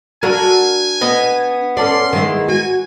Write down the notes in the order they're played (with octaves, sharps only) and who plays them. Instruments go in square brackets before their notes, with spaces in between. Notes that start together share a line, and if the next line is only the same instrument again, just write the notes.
[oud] D4 F#4 A4 [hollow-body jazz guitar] A#4 [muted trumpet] G#5
[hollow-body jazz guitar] B3 D#5
[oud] C#4 A4 D5 [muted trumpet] C6
[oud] D#3 G#3 E4
[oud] F#4 [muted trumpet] G#5